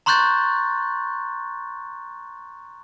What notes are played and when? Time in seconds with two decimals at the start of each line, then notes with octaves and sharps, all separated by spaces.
0.06 A#5 C6 C#6 F#6 G6 A6